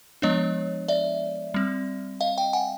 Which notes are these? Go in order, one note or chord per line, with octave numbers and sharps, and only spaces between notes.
F3 G#3 B3 D4 C#5 D#5
D5 E5
G3 C4
D#5 F5
F5 G5
F#5 G#5